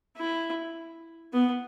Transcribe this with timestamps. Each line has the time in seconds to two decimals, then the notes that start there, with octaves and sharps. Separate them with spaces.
0.17 E4
1.33 B3